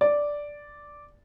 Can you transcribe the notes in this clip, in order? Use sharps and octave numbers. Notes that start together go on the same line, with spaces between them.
D5